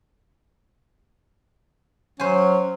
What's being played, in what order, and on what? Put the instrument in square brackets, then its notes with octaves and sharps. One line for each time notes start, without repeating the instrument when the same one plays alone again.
[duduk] F#3 [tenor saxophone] C#4 [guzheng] C5 G#5